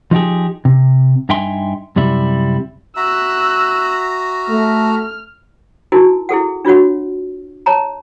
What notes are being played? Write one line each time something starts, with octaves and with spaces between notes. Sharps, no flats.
F3 D#4 F4 G4 G#4
C3
G2 D#4 E5 G5 G#5 C6
F#2 C3 G3 E4
F#4 E5 A#5 E6 F#6
A3 F6
D#4 E4 F#4 A#4 G#5
E4 G#4 A4 F#5
D4 F4 F#4 C#5 F#5
C#5 A5 A#5